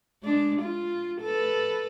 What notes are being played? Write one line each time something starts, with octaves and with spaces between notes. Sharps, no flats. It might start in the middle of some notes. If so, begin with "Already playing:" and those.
G#3 D4
F4
A4 B4